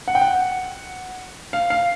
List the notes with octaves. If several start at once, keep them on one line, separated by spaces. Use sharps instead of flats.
F#5
G5
F#5
F5
F5